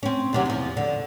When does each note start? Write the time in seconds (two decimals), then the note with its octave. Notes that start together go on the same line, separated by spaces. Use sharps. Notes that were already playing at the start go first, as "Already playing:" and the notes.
0.03 C4 C#4
0.33 D#2 C3 F#3
0.46 E2 F3
0.77 D3